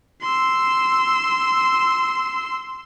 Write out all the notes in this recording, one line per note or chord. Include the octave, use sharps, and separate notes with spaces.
C6 E6